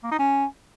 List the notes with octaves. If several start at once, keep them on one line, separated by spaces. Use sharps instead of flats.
A#3
D#4
C#4